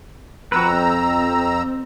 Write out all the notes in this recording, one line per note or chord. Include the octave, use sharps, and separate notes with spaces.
F2 F#4 B4 A#5 E6
C4